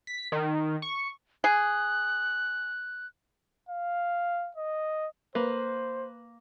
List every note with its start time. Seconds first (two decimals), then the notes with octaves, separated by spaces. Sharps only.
0.07 B6
0.32 D#3
0.82 C#6
1.44 G#4 F#6
3.69 F5
4.57 D#5
5.35 A#3 B4 C5